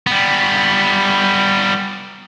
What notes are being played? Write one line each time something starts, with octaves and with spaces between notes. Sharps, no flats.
G3 B3